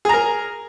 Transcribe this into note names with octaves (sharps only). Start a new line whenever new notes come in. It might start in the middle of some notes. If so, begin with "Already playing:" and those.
G#4 A#4 A#5